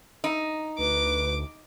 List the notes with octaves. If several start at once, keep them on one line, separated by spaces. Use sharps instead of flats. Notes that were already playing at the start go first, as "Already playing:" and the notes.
D#4
D2 B4 D6